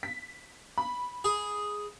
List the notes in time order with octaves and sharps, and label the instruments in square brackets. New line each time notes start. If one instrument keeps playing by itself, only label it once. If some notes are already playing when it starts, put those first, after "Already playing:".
[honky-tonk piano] B6
B5
[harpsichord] G#4